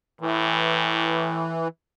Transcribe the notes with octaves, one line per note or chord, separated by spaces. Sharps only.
A2 E3